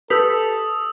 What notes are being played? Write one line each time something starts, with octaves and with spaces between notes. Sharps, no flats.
G4 A4 B4 D#6 E6 B6